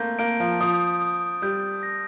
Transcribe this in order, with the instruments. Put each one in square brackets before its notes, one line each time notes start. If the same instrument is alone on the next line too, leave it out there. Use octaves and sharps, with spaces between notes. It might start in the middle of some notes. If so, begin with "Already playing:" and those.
Already playing: [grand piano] A3 A#3 C4 [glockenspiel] G6
[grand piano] A#3 [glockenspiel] D7
[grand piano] F3
[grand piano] F3 [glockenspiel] D#6
[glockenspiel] D#6
[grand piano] G3 [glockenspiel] G6
[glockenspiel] A#6